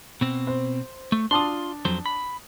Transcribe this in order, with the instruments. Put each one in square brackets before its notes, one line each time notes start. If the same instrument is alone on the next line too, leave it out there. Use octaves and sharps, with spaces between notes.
[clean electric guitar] B2 C4
[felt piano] C5
[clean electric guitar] A3
[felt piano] D4 A5 D#6 [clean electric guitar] F4 C6
[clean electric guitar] F2 F#3 C5
B5